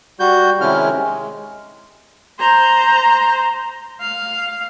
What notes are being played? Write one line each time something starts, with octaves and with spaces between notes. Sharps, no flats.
G3 F#4 G6
C3 D#3 G#3 C#4 E4 F6
G#3
C5 A#5
F5